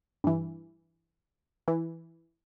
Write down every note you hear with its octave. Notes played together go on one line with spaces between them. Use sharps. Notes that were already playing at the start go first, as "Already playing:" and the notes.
G2 E3
E3